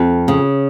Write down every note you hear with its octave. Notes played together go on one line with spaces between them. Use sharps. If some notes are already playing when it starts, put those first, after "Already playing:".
Already playing: F2
C#3